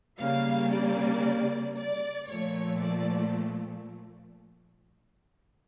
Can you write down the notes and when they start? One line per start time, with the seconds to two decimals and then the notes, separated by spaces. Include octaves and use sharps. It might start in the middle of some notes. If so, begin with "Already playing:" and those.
0.19 C#3 G3 A#3 F5
0.71 D5
1.76 D5
2.28 A#2 F3 A3 C#5
2.80 D5